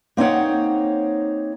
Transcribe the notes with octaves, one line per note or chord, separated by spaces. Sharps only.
A#3 C4 D#4 C#5 F#5